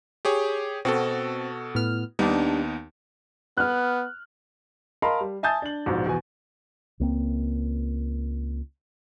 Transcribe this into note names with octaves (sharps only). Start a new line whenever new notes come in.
G4 G#4 C#5
B2 C4 F#4 A4
A2 B3 F6
D#2 G3 B3 D4 D#4
B3 F6 F#6
A#4 D#5 F5 A5 B5 C6
G3
E5 G#5 A5 D#6 G6 A6
D4 F#7
A#1 G#2 B2
E2 B2 B3 G#5
C#2 A#3 C4